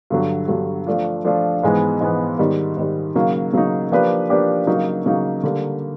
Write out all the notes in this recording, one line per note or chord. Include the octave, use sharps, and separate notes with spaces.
G2 D3 F#3
G2 D3 F#3
F3 A3 D4 F4
F3 A3 D4 F4
G#2 E3 G#3 B3
G#2 E3 G#3 B3
G#2 D#3 G3
G#2 D#3 G3
C#3 F#3 A#3 D#4
C#3 F#3 A#3 D#4
F3 A#3 D4 G4 B4
F3 A#3 D4 G4 B4
C#3 F#3 A#3 D#4
C#3 F#3 A#3 D#4
D3 G3 A#3